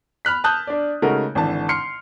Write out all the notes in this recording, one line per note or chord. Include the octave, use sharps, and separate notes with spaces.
B5 F6 F#6 B6
A5 D#6 F#6 G6
D4 D5
C#3 G#3 A3 D#4 F#4 A#4
G#1 D3 E3 A5
C6 F6 C7 C#7